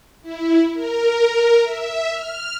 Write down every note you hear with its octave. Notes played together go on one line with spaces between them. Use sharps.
E4
A#4
E5
F6